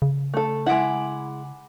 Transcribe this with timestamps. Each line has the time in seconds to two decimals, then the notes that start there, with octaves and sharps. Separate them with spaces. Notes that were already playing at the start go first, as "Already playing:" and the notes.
0.02 C#3
0.34 A3 A4
0.66 G#3 E4 F#5 B5 D6